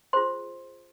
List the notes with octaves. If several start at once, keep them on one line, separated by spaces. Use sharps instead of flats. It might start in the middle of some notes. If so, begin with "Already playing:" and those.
F4 G#4 C5 C6